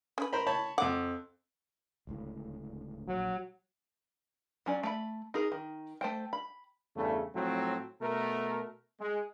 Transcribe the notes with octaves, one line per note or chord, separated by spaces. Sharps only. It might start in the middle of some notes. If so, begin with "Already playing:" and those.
C#4 B4
A#4 C5 B5
C#5 A5 B5
F2 F#5 D6
D1 C#2 A2
A#1 F#3
F#3 C#4 D5
A3 C#5 B5
D#4 G#4 A#4
D#3
A3 C5 G5
B5
E2 G2 C#3 A3
A2 F3 F#3 A3 C4
B2 A3 A#4
G#3